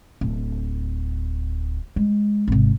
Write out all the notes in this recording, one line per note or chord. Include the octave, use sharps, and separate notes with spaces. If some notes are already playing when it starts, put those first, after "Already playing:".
D1
G#3
G#1 C3